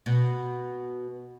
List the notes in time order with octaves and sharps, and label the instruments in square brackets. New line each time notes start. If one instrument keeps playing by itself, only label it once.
[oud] B2